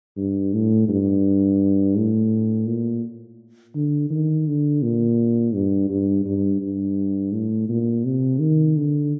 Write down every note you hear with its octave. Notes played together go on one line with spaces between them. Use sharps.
G2
A2
G2
A2
A#2
D3
D#3
D3
A#2
G2
G2
G2
G2
A2
A#2
C3
D#3
D3